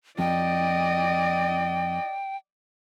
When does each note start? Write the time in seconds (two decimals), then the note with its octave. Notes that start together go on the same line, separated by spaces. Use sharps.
0.19 F2 D5 D#5 G5